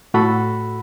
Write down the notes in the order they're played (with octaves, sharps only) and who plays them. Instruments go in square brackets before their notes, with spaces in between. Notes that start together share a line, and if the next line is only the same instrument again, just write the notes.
[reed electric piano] A2 F#4 A4 B5